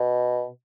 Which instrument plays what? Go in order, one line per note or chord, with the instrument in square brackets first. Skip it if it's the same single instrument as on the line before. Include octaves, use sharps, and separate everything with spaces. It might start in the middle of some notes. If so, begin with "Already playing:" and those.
Already playing: [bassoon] B2